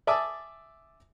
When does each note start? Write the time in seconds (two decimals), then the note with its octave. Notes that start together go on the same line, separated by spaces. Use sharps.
0.07 D5 E5 G#5 A5 D6 D#6